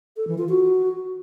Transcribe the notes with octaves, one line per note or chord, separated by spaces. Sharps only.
A4
E3
F4
F#4